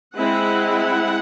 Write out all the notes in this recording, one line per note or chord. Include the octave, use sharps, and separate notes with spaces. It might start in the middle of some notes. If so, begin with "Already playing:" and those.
G#3 C4 E4 F#5